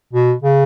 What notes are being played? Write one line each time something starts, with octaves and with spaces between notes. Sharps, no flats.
B2
C#3